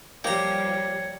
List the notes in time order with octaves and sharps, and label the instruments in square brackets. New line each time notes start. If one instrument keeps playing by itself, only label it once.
[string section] F3 G3 [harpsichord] A#3 A#5 [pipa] G4 [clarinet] C#5